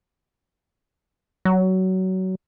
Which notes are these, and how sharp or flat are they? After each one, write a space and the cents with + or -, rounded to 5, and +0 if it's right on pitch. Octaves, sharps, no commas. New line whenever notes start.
F#3 +20